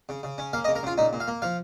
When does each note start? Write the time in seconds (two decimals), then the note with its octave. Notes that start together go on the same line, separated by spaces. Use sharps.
0.09 C#3
0.23 C#3
0.38 C#4
0.53 A#3 F5
0.64 D#5
0.68 C#3
0.75 A#4
0.83 C#3 F4
0.98 A#2 D#4
1.13 A#2
1.20 F5
1.28 A#3
1.42 F3 F5